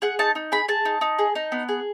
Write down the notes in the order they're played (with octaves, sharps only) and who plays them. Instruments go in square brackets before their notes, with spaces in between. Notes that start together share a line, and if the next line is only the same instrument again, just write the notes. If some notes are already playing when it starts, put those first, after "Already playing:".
[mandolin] G#4 F#5
D#4 A5
D#4
G#4 B5
G#4 A5
D#4
D#4
G#4
D#4
B3
G#4